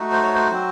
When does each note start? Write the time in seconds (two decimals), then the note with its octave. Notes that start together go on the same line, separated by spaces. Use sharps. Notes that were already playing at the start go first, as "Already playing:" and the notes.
Already playing: A3 D#4 F#4
0.11 C5
0.23 C#5
0.35 C5
0.50 F#3 C4 F#4